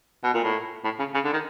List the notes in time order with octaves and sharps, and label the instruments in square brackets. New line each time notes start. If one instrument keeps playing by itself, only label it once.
[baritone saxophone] B2
A#2
A2
A2
C#3
C#3
D3
D#3